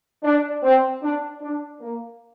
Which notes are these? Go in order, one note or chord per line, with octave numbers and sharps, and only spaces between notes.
D4
C4
D4
D4
A#3